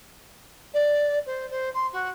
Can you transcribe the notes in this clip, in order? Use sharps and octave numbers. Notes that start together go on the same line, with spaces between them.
D5
C5
C5
C6
F#4